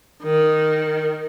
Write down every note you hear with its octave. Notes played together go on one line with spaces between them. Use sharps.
D#3